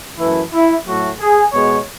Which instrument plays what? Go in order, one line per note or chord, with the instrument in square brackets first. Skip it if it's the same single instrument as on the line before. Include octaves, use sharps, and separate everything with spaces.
[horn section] F#2 E3 A3 E4
E4
A2 F#3 A3 F#4
G#4
B2 G#3 B3 C#5